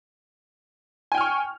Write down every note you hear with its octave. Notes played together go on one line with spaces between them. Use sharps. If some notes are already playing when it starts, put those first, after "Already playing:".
G5 G#5 C#6 F6